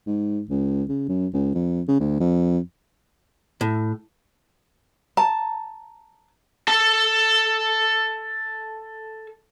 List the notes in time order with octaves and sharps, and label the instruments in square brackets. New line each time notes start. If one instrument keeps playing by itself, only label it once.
[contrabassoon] G#2
C#2
C#3
F#2
C#2
F2
C#3
D2
F2
[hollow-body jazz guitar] A2
[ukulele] A5 [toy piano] A#5
[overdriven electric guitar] A4 A5